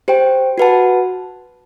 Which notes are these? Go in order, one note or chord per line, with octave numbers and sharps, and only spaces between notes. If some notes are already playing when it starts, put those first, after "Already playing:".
G4 C5 G5
F#4 B4 F#5 A5